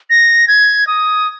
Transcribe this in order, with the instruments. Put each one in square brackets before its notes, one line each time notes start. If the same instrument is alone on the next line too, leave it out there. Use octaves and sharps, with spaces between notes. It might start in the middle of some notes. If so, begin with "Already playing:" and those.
[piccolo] A#6
G#6
D#6